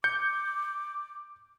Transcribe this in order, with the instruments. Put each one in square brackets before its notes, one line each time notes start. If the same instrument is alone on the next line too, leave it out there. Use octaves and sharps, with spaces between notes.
[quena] D6 [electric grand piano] G6 C#7